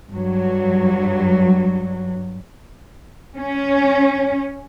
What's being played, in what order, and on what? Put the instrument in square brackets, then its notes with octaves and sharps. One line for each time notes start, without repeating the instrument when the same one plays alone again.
[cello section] G2 F#3
C#4